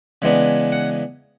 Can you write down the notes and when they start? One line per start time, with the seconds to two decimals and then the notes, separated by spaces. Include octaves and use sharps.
0.22 C#3 E3 G#3 B3 D4
0.72 F#5